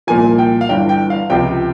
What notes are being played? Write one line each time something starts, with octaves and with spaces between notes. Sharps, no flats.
C2 A#2 F3 G#5
G5
F5
G1 G2 E3 G5
G5
F5
C#2 C3 F3 G5